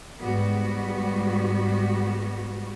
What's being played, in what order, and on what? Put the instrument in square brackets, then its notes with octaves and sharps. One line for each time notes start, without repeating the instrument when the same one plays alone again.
[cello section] G#2 G3 B3 F#4